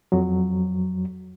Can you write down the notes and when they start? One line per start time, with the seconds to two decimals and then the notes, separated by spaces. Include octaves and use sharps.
0.12 F2 F#3